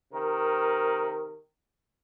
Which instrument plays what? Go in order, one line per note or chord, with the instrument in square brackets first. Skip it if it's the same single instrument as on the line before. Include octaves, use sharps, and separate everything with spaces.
[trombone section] C3 D#3 A#4